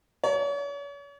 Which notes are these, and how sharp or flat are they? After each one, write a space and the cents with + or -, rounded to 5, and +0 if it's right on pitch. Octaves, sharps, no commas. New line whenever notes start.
C#5 +40